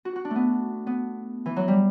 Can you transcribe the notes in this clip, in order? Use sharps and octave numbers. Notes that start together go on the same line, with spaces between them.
F#4
F#4
D4
A3
B3
B3
E3
F#3
G3